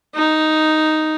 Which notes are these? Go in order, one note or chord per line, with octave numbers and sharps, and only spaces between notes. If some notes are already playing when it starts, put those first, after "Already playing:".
D#4